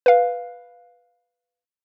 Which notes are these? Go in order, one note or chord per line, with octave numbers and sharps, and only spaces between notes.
B4 F5